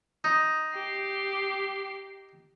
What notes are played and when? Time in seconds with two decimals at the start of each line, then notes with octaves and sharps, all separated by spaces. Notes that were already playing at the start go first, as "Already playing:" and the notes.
0.24 D#4
0.75 G4 C7